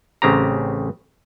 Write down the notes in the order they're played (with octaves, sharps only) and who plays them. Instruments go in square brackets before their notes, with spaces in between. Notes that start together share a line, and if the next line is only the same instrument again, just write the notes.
[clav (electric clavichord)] A1 C#3 C4 G4 A#5